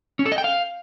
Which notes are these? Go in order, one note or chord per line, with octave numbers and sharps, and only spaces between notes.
C#4
A4
D#5
G5
F5